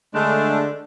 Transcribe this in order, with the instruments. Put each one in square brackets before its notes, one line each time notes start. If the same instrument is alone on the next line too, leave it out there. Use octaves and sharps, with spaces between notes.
[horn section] D3 D4 [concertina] G#3 A3